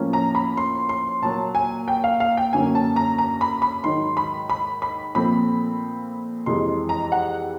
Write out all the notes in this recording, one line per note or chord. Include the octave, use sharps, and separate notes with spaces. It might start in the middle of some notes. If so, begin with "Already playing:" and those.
Already playing: A2 F3 A#3 C#4
A#5
B5
C6
C6
A#2 F#3 A#3 A5
G#5
G5
F5
F5
G5
F#2 D3 F#3 A#3 C#4 G#5
A5
A#5
A#5
B5
B5
G#2 D#3 F#3 C6
B5
B5
B5
A#2 F3 A3 C4 B5
F2 C3 E3 G#3 C6
A#5
F#5